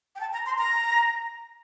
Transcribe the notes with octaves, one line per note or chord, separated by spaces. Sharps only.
G5
A5
A#5
C6
A#5